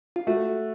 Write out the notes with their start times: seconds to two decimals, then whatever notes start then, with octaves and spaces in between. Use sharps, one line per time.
0.16 F4
0.27 A3 F#4